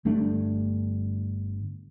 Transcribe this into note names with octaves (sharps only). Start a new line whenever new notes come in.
G1 G2 A3 D4